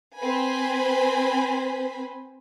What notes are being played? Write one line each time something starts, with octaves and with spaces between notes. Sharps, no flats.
C4 B4 C5 G#5 B5